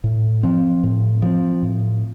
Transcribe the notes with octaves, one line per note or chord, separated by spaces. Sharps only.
A2
F3 C4
A2
F3 C4
A2